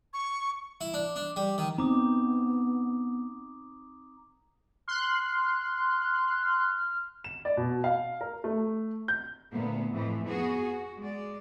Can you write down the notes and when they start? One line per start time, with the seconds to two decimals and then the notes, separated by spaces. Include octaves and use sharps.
0.13 C#6
0.81 E4
0.94 D4
1.16 D4
1.36 G3
1.58 D#3
1.78 B3 C4 D#4 A#5 D6 D#6
4.88 C6 F6 F#6
7.24 E7
7.45 D5
7.57 B2
7.84 F5
8.21 A#4
8.44 A3
9.08 G6
9.52 D2 A#2 A#3 B3
9.93 F2 A2 E3 F3
10.25 B3 F#4 G#4
10.65 F#4
11.00 G#3 D5